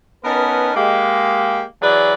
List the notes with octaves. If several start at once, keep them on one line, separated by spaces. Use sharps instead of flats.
B3 C#4 D#4 A#4 B4 A5
G#3 A#3 G4
E3 F#3 G#4 B4 D5